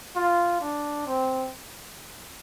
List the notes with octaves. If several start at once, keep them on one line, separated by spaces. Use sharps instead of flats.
F4
D4
C4